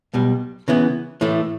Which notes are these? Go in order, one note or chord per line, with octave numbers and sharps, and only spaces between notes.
B1 B2 G3
C#3 E3 B3
A2 E3 A3